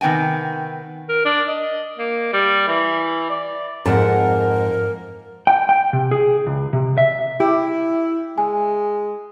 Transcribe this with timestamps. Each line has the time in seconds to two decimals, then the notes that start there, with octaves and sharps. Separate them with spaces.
0.01 C3 D#3 B3 G5 G#5
1.09 A#4
1.25 D4
1.48 D#5
1.98 A#3
2.33 G3
2.67 E3
3.29 D5
3.86 F2 G#2 A#4 F#5 A5
5.47 G5
5.69 G5
5.93 C3
6.11 G#4
6.46 C#2
6.73 C3
6.98 E5
7.40 E4 G4
8.38 G#3 G#5